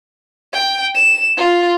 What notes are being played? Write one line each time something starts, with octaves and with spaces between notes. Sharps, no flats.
G5
E7
F4